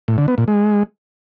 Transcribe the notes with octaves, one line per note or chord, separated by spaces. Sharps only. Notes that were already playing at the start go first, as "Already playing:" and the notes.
A2
D3
B3
A#2
G#3